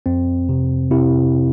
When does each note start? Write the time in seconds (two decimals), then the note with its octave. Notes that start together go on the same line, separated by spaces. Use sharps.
0.06 F2 C4
0.49 C3
0.91 C3 E4